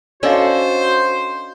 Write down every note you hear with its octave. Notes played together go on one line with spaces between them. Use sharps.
C#4 D4 F#4 A4 C5 D5 D#5 F5